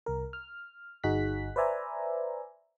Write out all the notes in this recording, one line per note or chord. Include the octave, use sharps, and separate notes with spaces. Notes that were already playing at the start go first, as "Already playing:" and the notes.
C2 A#4
F6
G1 D#4 F#4 G#4 F#6 B6
B4 C5 D5 E5 G#5 A#5